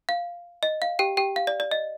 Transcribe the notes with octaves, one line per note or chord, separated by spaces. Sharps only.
F5
D#5
F5
G4 G5
G4 G5
F5
D5
D5
D#5